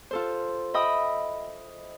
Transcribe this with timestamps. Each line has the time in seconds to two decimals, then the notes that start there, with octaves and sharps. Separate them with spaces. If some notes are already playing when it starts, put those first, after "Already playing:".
0.11 F4 A4 C5
0.74 D#5 E5 G5 B5 D#6